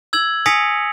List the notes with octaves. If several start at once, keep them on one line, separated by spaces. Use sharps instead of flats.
E6 G#6 F#7
G#5 D#6 A#6 B6 C#7 F7